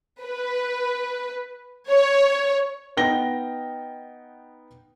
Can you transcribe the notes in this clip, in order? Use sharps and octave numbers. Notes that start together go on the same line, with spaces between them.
B4
C#5
B3 D#4 G5 A#6 G7